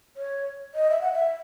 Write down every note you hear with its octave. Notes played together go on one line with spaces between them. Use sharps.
C#5
D#5
E5
F#5
E5